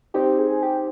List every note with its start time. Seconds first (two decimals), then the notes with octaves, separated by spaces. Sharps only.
0.14 C4 D#4 G4
0.38 G#4
0.62 G4